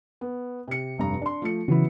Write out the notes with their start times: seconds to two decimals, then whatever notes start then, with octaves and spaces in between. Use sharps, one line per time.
0.21 B3
0.68 C3 C#7
0.98 F1 G2 A#5
1.22 D4 C6
1.42 F3 A3 C#7
1.68 C#3 E3 F#3 B3 E4